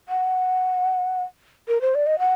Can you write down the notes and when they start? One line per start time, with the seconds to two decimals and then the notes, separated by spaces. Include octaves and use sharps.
0.09 F#5
1.68 A#4
1.81 C5
1.95 D5
2.06 D#5
2.19 F#5